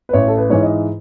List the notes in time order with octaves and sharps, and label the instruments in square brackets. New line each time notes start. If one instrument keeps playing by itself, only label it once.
[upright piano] B4
A1 C#5
A4
B4
G#2 E3 C#5
D#5